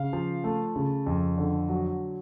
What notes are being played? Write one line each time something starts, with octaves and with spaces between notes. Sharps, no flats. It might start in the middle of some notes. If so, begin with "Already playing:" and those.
Already playing: C#3 F5
F3
A3
C#3
F2
D3
F#3